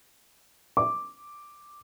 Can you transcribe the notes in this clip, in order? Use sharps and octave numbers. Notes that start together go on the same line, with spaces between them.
D6